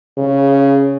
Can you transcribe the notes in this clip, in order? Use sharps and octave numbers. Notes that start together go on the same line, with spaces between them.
C#3